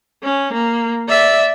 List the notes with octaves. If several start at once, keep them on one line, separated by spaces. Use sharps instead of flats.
C#4
A#3
D5 E5